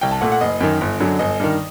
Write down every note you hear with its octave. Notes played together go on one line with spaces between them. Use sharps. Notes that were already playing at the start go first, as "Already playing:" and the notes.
C2 G5
A5
A#2 A3 F#5
F#5
F#1 D#5
F#2 D#3
G1
F#2 D3 F#3
G1 D#5
G2 D#3